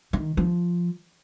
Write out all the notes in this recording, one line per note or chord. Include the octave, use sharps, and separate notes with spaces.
D#3
F3